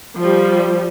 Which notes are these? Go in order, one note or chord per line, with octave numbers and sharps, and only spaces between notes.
F3 G3